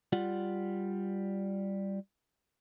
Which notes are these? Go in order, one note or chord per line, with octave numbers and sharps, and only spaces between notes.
G3 F4 F#5